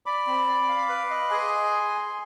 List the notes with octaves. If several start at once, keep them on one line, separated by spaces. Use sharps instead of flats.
D5 B5 D6
C4
D5
F5
B4
D#5
G#4 G#5 C6